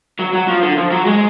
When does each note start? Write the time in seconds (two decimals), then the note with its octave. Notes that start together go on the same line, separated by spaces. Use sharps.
0.19 F#3
0.33 F#3
0.48 F3
0.62 D3
0.77 F3
0.91 F#3
1.06 G#3